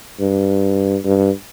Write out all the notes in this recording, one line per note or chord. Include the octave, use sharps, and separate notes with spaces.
G2
G2